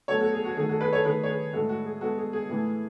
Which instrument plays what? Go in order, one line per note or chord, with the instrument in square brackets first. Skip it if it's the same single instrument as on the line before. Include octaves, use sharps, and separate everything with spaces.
[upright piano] B2 F#3 A3 A4 C#5
F#4 A4
G#4
F#4
D#3 A3 G#4
F#4 A4
G#4 B4
A4 C#5
D#3 A3 G#4 B4
C#5
G#4 B4
A2 G#3 F#4 A4
F#4
G#4
B2 G#3 F#4 A4
G#4
G#4
A2 E3 A3